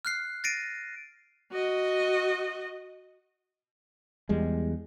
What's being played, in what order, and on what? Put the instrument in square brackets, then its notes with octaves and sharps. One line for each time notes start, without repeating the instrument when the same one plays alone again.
[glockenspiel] F6 F#6 C7
A6 A#6 C7 D7 D#7
[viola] F#4 D#5
[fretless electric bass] E2 G3 G#3